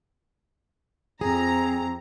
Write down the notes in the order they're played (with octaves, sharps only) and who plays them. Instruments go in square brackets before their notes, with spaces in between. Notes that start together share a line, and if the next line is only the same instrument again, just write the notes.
[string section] F2 A#5 [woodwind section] C4 [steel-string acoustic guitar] G#4